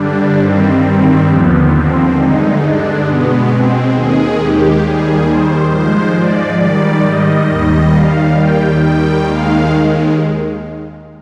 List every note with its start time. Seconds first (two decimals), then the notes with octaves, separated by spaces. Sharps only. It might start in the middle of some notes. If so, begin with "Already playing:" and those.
Already playing: G2 D3 G3 D4
0.38 G2 D#3 G3 C4
0.83 C4
1.26 D#2 D3 F3 B3
1.71 C4
2.15 G2 D3 G#3 D#4
2.60 D4
3.04 B2 G#3 B3
3.48 C4
3.92 D#2 D#3 G#3 G#4
4.37 G4
4.81 D#2 D#3 G3 G#4
5.25 C5
5.70 G#2 F3 G#3 C5
6.15 D5
6.59 G#2 D#3 G3 D5
7.03 D#5
7.47 D#2 D#3 G3
7.92 F5
8.36 D#2 D#3 G3 G5
8.81 G5
9.25 D#2 D#3 G#3 F5